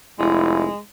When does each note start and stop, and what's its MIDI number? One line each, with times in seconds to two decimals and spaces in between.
0.19 0.67 29
0.19 0.79 56
0.19 0.65 64